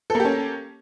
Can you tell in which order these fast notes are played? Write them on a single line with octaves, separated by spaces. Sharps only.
A4 A#3 G4 C#4